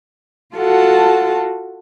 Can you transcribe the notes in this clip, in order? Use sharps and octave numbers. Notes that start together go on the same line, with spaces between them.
F4 F#4 A4 F#5 A5